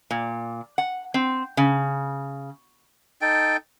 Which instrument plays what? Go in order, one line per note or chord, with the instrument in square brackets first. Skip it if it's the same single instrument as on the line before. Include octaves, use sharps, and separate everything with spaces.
[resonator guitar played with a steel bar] A#2
F#5
C4
C#3
[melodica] D#4 A4 G5